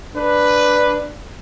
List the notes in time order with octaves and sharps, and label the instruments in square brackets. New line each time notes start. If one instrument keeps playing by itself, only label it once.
[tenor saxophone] D4 [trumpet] B4